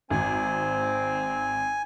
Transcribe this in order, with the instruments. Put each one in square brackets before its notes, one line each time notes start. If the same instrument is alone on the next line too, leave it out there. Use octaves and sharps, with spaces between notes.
[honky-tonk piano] G#1 [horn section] C4 [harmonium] G#5